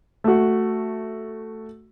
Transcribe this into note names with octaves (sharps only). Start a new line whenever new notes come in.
A3 F#4